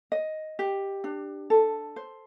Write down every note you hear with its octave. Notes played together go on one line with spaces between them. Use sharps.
D#5
G4
D4
A4
C5